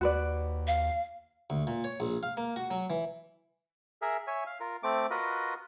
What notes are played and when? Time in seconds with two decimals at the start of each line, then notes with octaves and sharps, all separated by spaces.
0.01 D#2 F#4 B4 D5
0.67 F5
1.50 D2
1.67 A#2
1.84 C#5
2.00 A#1
2.23 F5
2.37 A#3
2.56 F#4
2.71 F#3
2.90 E3
4.02 G#4 A#4 E5
4.27 C#5 E5 G#5
4.46 F5
4.60 F4 A#4
4.83 A3 C4 D6
5.10 F4 F#4 A#4 B4 D#5